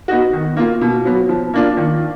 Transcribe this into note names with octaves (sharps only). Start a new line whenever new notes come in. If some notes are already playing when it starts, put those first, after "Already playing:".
B3 D#4 F#4
D#3
A#3 F4
B2
F#3 B3
F3
A#3 D4 F4
D#3